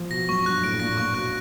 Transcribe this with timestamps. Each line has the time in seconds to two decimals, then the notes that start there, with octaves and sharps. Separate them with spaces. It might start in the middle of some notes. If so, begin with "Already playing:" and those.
Already playing: F3
0.10 B2 A#6
0.29 F#2 C#6
0.46 G2 F#6
0.62 A2 D7
0.74 A2
0.80 A#2 A#6
0.98 A#2 C#6
1.14 B2 F#6